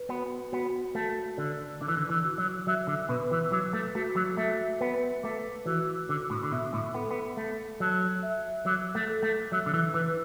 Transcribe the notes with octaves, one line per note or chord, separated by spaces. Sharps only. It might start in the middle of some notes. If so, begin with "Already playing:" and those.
Already playing: B4
B3 F#4
B3 F#4
A3 A5
D3 D5
D3 D6
E3
D3
E3
F#4
F#3
F#3 E5
D3
B2 B4
E3
F#3 D6
A3
A3 F#4
F#3
A3 E5
B3 B4
A3 D6
E3 F#4
D3 D6
A2
D3
B2 E5
A2
B3 A4
B3
A3 A4
F#3 A5
E5
F#3 D6
A3
A4
A3
F#3 E5
D3
E3
E3 B4